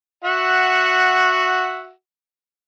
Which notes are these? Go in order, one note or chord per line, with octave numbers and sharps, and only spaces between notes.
F#4 E5 F#5